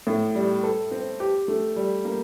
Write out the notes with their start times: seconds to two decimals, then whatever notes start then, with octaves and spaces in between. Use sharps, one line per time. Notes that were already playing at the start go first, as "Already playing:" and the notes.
0.07 A2
0.35 G3
0.63 A4
0.91 C4
1.20 G4
1.48 A3
1.76 G3
2.05 A#3